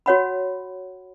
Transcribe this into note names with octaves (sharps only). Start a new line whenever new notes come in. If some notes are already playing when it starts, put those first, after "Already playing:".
F#4 C#5 F#5 B5